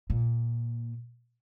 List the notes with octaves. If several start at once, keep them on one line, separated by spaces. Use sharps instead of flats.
A#2